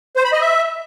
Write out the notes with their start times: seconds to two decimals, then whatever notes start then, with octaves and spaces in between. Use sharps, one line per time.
0.16 C5
0.24 B5
0.33 D#5
0.41 E5